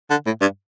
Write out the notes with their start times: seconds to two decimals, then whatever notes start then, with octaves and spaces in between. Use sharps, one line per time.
0.10 D3
0.26 A2
0.41 G2